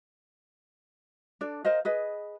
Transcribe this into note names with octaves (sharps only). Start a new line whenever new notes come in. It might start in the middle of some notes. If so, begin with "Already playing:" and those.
D4 A4 D5
A#4 C5 D#5 F5
G#4 B4 D#5